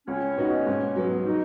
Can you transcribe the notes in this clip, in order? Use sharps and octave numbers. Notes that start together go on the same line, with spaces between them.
C#2 C#4
B2 B3 D#4 F#4
G#2
F#3 B3
F#3 D#4